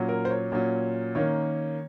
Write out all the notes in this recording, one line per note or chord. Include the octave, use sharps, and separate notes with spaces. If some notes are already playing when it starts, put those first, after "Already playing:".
Already playing: A#2 F#3 C#4
A#4
C5
C#5
A#2 F#3 C#4
D#3 A#3 C#4 C#5